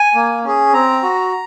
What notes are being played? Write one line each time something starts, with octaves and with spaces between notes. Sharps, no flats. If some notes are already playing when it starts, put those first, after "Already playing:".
Already playing: G#5
A#3
C#4 G#4
C4 A#5
F#4